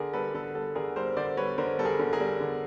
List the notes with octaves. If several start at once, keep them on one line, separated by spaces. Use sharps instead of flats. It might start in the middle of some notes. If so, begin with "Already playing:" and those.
Already playing: D3 G#4 A#4
G3 A4 B4
D3 A4
G3 A4
D3 G#4 A#4
G3 A#4 C5
D3 C5 D5
G3 B4 C#5
D3 A#4 C5
G3 A4
G#4 A#4
D3
G#4 A#4
G3
D3